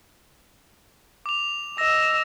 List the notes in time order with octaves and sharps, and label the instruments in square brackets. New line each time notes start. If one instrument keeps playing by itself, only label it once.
[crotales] D6 F7
[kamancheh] D#5 E6 [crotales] A#6